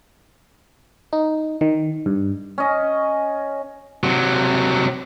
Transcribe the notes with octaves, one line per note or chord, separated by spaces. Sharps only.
D#4
D#3
G2
C#4 D#5
C3 F#3